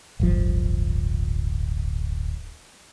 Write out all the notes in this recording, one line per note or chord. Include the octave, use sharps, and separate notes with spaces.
D1 G1 F3